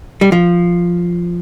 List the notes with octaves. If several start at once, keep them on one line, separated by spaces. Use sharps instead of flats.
G3
F3